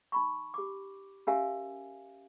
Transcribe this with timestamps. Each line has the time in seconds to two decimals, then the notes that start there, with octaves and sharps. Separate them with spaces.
0.12 D#4 B5 C#6
0.54 G4 D6
1.27 C#4 G4 A#4 E5 F5 G#5